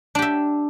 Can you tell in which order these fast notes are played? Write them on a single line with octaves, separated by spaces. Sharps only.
D4 G4 E5